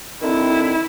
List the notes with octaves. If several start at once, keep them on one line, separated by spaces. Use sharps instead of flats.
D3 D#3 C4 E4